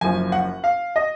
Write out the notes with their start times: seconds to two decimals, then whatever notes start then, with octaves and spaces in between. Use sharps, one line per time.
0.01 F#1 F#2 F3 G#5
0.32 F#5
0.64 F5
0.96 D#5